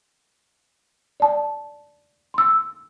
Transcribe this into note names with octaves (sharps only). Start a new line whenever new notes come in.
D5 A5
C6 E6